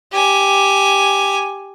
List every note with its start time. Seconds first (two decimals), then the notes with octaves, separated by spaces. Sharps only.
0.12 G4 G#5